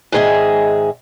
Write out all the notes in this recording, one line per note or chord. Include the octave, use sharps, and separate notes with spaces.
G#2 D#3 G#4 D#5 E5